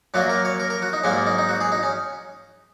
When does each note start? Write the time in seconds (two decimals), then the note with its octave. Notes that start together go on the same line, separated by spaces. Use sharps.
0.14 F#2 F#3 A#3 F#4
0.30 A#4
0.45 C#5
0.60 A#4
0.70 A#4
0.82 F#4
0.93 D#4
1.04 G#2 F#3 A#3 C#4
1.26 D#4
1.38 D#4
1.49 F#4
1.61 G#4
1.72 D#4
1.83 C#4